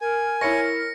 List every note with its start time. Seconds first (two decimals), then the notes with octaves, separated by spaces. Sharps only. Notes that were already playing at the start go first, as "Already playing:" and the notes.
0.01 A#4 G#5
0.41 E4 C#5 A#6 C#7